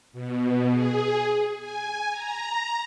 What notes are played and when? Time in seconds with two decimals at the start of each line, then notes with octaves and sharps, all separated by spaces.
0.13 B2
0.71 G#4
1.57 G#5
2.10 A#5